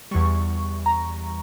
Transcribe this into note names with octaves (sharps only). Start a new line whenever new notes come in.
E2 E3 G3 C#6
A#5